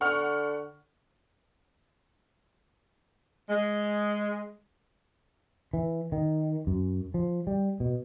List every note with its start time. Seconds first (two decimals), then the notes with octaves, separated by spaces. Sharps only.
0.01 D3 F#5 C#6 F6
3.49 G#3
5.73 E3
6.12 D#3
6.67 F#2
7.14 F3
7.47 G3
7.80 B2